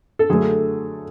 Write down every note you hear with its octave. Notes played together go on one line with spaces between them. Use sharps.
A4
D3 F#3 A3 G#4